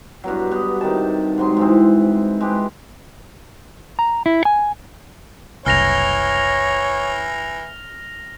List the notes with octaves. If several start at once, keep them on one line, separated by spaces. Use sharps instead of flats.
G2 B2 F#3
B3
C3 D#3 D#4 A5
G#2 F#3 C6
G#2 E3 C4
G#3 G4 B4
A#5
E4
G#5
F#1 C2 E3 C#5 F6 A#6 F7